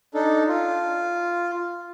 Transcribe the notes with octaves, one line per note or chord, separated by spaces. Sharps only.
D4 D#4 A4
F4